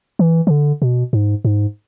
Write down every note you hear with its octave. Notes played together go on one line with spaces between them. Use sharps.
E3
E3
D3
B2
G#2
G#2